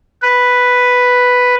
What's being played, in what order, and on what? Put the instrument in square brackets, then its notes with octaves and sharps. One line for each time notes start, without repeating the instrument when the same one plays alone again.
[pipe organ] B4